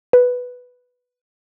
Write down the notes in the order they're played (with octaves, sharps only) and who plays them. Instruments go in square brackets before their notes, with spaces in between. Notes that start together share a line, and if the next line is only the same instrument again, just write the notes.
[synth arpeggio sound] B4